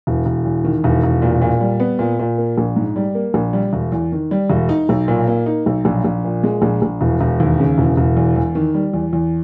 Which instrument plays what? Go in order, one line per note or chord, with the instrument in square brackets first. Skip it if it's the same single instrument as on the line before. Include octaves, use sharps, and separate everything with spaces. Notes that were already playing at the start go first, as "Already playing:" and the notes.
[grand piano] E1
E1
E2
D#3
E1
E1
A#2
A#2
G3
B3
A#2
A#2
A#3
A#1
G#2
G3
A#3
A#1
G3
E1
E2
D#3
G3
E1
D#4
B1
A#2
A#3
D#4
B1
A#1
A#1
A#2
G#3
A#1
A#1
E1
E1
D#2
C#3
E1
E1
E2
E2
D#3
G3
E2
E2